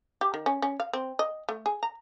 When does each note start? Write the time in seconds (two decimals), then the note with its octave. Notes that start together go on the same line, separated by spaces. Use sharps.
0.21 G4
0.34 D#3
0.46 C#4
0.62 C#4
0.80 F5
0.93 C4
1.19 D#5
1.49 A3
1.66 G#4
1.83 A#5